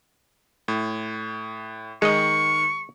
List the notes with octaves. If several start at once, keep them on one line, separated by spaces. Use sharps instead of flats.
A2
D#3 G#3 D#5 C#6